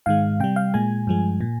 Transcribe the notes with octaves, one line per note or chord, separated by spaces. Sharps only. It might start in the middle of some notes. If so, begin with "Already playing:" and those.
G#2 D#3 G#3 F5
C3 G3 G5
F5
A#2 G#3 G#5
G2 F3 G#3
A#2